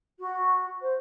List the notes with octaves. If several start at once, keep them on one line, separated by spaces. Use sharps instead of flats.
F#4
C5